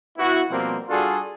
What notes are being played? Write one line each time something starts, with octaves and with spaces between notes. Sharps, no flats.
B3 E4 F#4
B2 F3 G3 A#3 C4
G3 D4 F4 F#4 G#4 A4